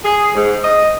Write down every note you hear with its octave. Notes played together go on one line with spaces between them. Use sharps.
G#4
G#2
D#5